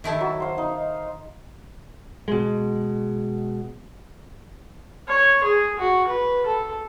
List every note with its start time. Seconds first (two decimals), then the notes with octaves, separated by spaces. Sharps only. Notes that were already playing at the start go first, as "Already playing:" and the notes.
0.04 D#3 E4 A4
0.21 F#3
0.40 C5 F5
0.58 D#4
2.28 B2 G#3
5.09 C#5
5.44 G#4
5.79 F#4
6.08 B4
6.46 A4